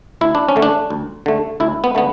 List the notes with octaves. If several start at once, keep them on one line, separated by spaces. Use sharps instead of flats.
D2 E4
D4
C#4
D3 A3
D4
D2
D3 A3
D2 E4
B3
D3 A3 B3